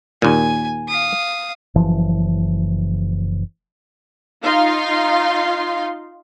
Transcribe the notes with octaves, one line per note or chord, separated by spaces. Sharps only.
D#2 A#2 G#5
F5 D#6
F#1 E3 F3
D#4 F4 F5 C6